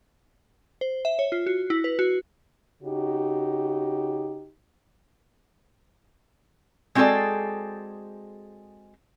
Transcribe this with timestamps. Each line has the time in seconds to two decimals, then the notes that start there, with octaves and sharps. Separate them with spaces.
0.81 C5
1.05 E5
1.19 C#5
1.32 F4
1.46 F#4
1.70 E4
1.84 B4
1.99 F#4
2.83 C#3 D#4 F#4 G4
6.95 G#3 C4 F#4 G#4 A4 D5